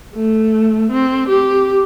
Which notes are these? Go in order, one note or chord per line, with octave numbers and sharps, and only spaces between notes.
A3
C4
G4